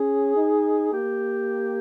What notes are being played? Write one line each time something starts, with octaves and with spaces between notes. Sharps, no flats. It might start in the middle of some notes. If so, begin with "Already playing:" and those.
Already playing: C#4 G#4
D#4
A#3 G4